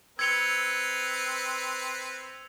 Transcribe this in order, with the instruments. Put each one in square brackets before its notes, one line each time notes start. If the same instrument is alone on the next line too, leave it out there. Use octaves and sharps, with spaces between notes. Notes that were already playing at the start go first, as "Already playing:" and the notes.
[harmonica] C4 B4 [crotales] E6 F7 [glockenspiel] G#6 C#7 G7